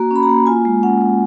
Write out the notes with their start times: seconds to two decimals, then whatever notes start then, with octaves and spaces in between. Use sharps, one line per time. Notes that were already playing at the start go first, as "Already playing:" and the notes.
Already playing: A#3 F#4 A#5
0.11 C#4
0.16 B5
0.23 A#5
0.29 A#3
0.46 F4 G#5
0.65 G#3
0.83 C#4 F#5
1.01 G#3